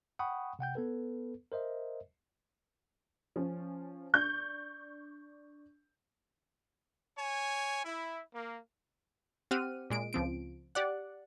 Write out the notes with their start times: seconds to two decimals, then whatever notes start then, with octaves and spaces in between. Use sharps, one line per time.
0.19 F#5 G5 B5 C#6 D#6
0.59 C3 F#5 G5 G6
0.75 B3 A4 B4
1.52 A#4 C5 D#5 E5
3.36 F3 C#4
4.13 D4 C#6 G6
7.18 C#5 G#5
7.85 E4
8.34 A#3
9.51 C4 G4 F#5 F6 D#7
9.90 A#2 G#3 D7
10.13 C#2 F3 C4 D7
10.75 G4 D5 F#5